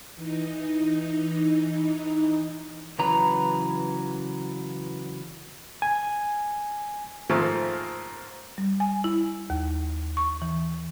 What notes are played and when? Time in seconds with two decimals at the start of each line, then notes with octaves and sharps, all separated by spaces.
0.16 E3 D#4
2.99 C#3 E3 F#3 B4 A#5
5.82 G#5
7.29 G#2 D#3 F3 A3 A#3 C4
8.58 G3
8.80 G#5
9.04 E4
9.50 D#2
10.17 C#6
10.42 E3